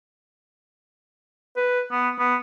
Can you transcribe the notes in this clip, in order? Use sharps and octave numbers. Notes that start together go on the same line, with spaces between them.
B4
B3
B3